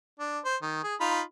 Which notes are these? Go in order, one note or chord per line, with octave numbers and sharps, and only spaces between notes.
D4
C5
D#3
G#4
D#4 F4 B5